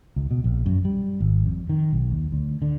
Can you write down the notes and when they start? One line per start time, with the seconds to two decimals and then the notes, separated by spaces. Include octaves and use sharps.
0.16 C#2
0.31 B2
0.44 A#1
0.66 F#2
0.85 G3
1.20 G#1
1.46 F2
1.69 D#3
1.93 B1
2.11 D#2
2.32 D2
2.62 D3